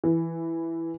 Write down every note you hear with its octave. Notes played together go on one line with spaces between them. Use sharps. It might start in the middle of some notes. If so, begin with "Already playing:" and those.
E3